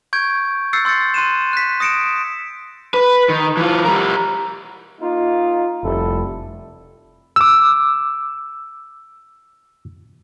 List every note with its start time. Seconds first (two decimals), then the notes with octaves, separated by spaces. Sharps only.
0.13 C#6 G6 G#6 D7
0.73 E6 F#6 G6 A6 C7 C#7
0.85 C6 E6 G6 A6 C#7
1.14 C6 F#6 D#7 E7
1.53 F#6 B6
1.80 D#6 A#6 C#7 D7 E7
2.94 B4
3.29 D#3
3.57 E3 F4
3.85 G3 A#4
5.01 A#3 D#4 F4
5.83 F1 G3 E4 A4
7.36 D6 E6